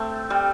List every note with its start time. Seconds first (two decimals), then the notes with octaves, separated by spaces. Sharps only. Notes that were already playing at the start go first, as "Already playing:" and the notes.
Already playing: A3 C4
0.30 G3